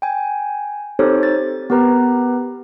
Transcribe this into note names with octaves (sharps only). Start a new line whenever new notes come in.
G5 G#5
C4 D#4 G4 A4 C5 C#5
A6
B3 G4 A#4 B4 A#5